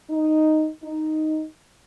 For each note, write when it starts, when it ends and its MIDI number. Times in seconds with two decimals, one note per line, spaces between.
0.10 0.68 63
0.82 1.44 63